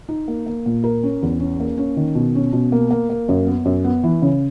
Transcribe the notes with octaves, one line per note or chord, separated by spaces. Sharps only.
D#4
A#3
A#3
A#2
A#4
C#4
E2
C#4
A#3
C#4
D#3
B2
C#4
B2
A#3
A#3
A#3
F#2
B3
F#2
B3
E3
C#3